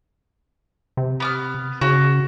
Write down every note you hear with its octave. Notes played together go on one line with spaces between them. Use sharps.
C3
B3 D6 F6
C#3 F#4